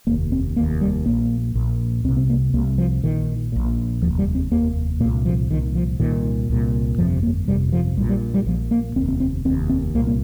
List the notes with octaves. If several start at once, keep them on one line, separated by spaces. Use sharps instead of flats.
F1 D#2 A#3
C4
F1 D#2 A#3
G3
A#1 A#2 A#3
A#1 A#2
C2 C3 C4
C4
A#3
C2 C3 A#3
F3
A#1 A#2 D#3
A#1 A#2
F1 D#2 F3
G3
C4
F1 D#2 A#3
C2 A#2 A#3
F3
C2 A#2 D#3
F3
C2 A#2 D#3
C2 A#2
G1 F2 C3 F3
A#3
G1 F2 C3 G3
F3
A#1 A#2 G3
G3
G3
A#1 A#2 F3
A#3
F1 D#2 C4
C4
C4
F1 D#2 C4
C4
C2 A#2 A#3
A#3